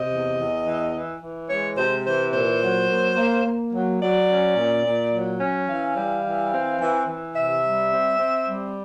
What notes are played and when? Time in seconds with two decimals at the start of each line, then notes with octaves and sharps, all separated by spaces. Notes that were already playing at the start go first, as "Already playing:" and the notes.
Already playing: C3 D#5
0.10 E2
0.38 E2
0.66 E3
0.93 E3
1.21 E3
1.49 G#3 C#5
1.76 C3 C5
2.04 E3 C5
2.32 A#2 C5
2.60 F#3
2.89 A#3
3.15 A#3
3.44 A#3
3.72 F#3
3.99 F#3 D5
4.27 C#4
4.55 A#2
4.83 A#2
5.12 F#3
5.40 C#4
5.66 E3 F5
5.95 G3
6.22 E3
6.51 C4
6.79 E3
7.07 E3
7.34 C3 E5
7.63 G3
7.90 C4
8.18 C4
8.46 G3